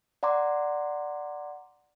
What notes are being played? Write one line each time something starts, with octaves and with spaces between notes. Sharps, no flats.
D5 F#5 A#5 C6 D6